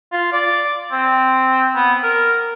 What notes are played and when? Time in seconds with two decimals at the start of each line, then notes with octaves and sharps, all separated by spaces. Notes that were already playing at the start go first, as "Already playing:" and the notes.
0.13 F4
0.33 D5
0.92 C4
1.75 B3
2.03 A#4